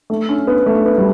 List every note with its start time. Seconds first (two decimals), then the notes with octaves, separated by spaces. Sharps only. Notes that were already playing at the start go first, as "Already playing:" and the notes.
0.10 A3
0.29 C#4
0.47 B3
0.66 A3
0.86 B3
0.98 G3